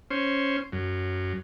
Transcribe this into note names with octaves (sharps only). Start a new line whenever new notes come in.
C#4 C5
F#2